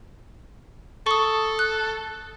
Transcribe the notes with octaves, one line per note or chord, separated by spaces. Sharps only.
A4 C#6 D#6
F#6